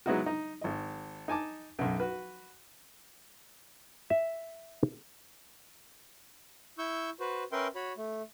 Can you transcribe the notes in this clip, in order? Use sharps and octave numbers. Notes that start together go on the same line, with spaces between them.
F#3 G#3 B3 D#4 E4 F#4
D#4
G#1 D#5
D#4 G#5 A5 D6
B1 F#2
F#4 B4
E5
E4 C#6 E6 G6
F#4 B4 C5
C#4 A#4 B4 E5 G5 C6
F#4 C#5 B5
A3